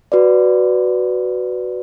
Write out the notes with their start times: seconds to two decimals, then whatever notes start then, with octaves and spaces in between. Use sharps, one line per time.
0.12 F#4 B4 D5